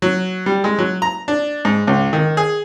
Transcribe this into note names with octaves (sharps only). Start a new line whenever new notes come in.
F#3
G3
G#3
F#3
A#5
D4
G#2
C#2
D#3
G#4